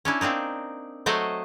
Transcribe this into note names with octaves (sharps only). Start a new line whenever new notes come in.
C#4 D4 E4
A#3 C4 D4 D#4
F#3 A3 C5 D#5 F#5